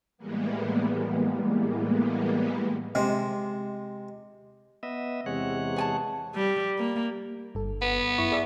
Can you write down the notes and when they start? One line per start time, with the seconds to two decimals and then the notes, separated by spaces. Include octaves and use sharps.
0.18 A2 E3 G3 G#3 A#3 B3
2.95 C3 G#3 C4
4.83 B3 D#5 E5
5.26 E2 C3 G#3 C#5 F#5
5.76 G#4 G#5 A5
6.36 G3
6.78 A#3
7.54 G1 G2 A4
7.82 B3
8.18 F#2 E4 C#6
8.32 G#4 D5 E5